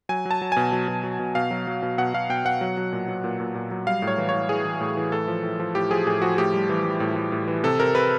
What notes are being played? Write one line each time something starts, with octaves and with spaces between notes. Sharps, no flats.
F#3 G#5
F#3
A5
F#3
B2 G#5
F#3
B2
F#3
B2
B2 F5
F#3
F#3
B2
B2 F#5
B2 F5
B2 G5
B2 F#5
F#3
F#3
A#2
F#3
A#2
A#2
A#2
F#3
G3 F5
A2
C#5
E3
C#5
E3
E3 G#4
E3
A2
E3
A2 A4
F3
A2
F3
A2 G4
F3 G#4
A2 G#4
F3 F#4
A2 G4
G3
E3
G3
A2
A2
A2
E3
C3 A4
C3 A#4
C3 B4